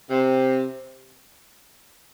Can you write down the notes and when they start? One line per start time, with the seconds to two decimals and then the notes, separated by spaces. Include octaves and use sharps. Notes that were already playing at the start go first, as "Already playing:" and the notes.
0.10 C3